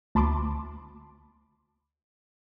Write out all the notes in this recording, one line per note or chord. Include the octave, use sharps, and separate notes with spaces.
D2 A5 B5 C6 D6